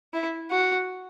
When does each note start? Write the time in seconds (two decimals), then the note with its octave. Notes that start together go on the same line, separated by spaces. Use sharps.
0.13 E4
0.51 F#4